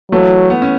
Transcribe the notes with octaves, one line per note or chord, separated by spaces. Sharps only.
E3 F#3 A3
B3
C#4